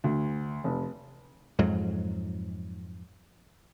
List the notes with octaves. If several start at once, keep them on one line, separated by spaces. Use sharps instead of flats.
D2
F1
F2 G#2 F#3